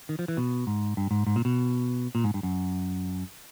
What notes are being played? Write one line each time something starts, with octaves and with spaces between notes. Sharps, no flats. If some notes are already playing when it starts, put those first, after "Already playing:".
D#3
F3
E3
B2
G#2
G2
G#2
G#2
A#2
B2
A#2
G#2
G2
F#2